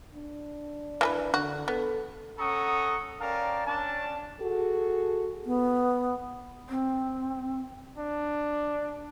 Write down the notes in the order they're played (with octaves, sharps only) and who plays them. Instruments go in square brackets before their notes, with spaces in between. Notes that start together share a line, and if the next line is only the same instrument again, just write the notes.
[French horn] D4
[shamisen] E3 A4 B4
[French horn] D3 [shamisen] F#4
[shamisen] B3 [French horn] A4
[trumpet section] C#4 A4 F#5 A#5 C#6 D#6
C#4 A#4 D5 F5 G5 A5
C#4 D4 A5
[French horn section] F#4 G#4 A4
[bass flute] B3
[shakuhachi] C4
[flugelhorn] D4